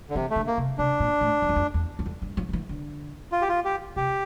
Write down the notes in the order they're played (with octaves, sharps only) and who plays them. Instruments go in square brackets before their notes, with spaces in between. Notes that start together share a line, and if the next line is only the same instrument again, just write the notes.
[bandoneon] D3
[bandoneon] C3 [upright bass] E3
[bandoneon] A3
[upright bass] D3
[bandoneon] A#3
[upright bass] C3
[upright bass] C3 [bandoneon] D4
[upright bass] A#2
A2
F2
E2
F2
E2
E2
F2
G2
F3
D3
E3
D3
[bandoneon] F4
G4
F4
G4
[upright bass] C3 [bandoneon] G4